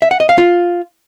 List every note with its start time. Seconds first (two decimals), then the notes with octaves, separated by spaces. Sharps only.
0.02 E5
0.11 F#5
0.20 D#5
0.29 F5
0.38 F4